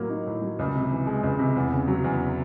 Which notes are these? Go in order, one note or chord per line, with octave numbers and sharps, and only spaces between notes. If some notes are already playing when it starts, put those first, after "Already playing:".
Already playing: A2 F#3 A#3
D#4
A2
F#3
C#2
C3
E3
G#3
C#2
C3
E2
C#3
F#3
E2